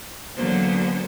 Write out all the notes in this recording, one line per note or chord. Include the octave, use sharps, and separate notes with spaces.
D3 F#3 A#3 B3 C#4 C5